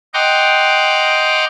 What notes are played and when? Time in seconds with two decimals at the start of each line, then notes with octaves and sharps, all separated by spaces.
0.14 D#5 F#5 G5 A#5 C6 D6